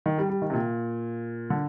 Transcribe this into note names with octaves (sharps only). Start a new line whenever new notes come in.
D#3
G3
G3
D#3
C3
A#2
D3